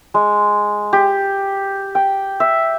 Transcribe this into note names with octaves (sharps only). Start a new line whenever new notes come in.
G#3
G4
G5
E5